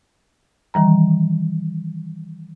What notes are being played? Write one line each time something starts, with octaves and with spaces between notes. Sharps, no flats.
D#3 E3 G3 A#5